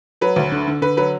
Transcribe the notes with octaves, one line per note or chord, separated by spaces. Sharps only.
F#3 B4
D2
D3
D3
D3 B4
F#3 B4